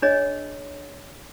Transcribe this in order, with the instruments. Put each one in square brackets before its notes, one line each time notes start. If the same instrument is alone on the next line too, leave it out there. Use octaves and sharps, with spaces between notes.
[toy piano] D4 G#4 C#5 D#5